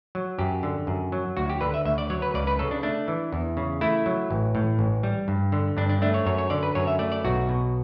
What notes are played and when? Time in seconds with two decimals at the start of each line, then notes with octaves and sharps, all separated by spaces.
0.15 F#3
0.38 F#2 G4
0.63 D3
0.87 F#2
1.12 F#3
1.37 D2 F#4
1.50 G4
1.61 D3 B4
1.74 E5
1.85 D2 E5
1.98 D5
2.10 F#3 C#5
2.22 B4
2.34 C#2 D5
2.47 B4
2.59 C#3 A4
2.71 D4
2.83 A3 D4
3.08 E3
3.33 E2
3.57 C#3
3.81 A3 E4
4.06 F#3
4.31 A1
4.55 A2
4.79 A1
5.03 G3
5.28 G2
5.52 D3
5.77 G2 D4
5.89 D4
6.02 A3 D4
6.14 C#5
6.26 F#2 C#5
6.38 C#5
6.50 D3 D5
6.63 B4
6.75 F#2 C#5
6.87 E5
6.99 A3 D5
7.12 D5
7.24 B1 F#4
7.49 B2